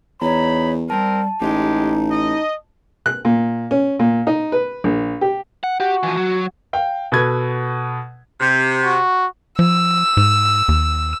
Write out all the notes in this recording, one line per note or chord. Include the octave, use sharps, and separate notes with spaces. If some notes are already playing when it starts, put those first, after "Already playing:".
E2 D#4 C#5 A#5 B5
G3 C4 A#4 A5
A1 G#3 D#4 G4
D#5
F#6
A#2
C#4
A#2
D#4
B4
A#1
G4
F#5
F#4 G4
E3 F3
F#3
F5 G5
B2 A4 B4 G#6
C3
F#4
F3 E6
G#2
D#2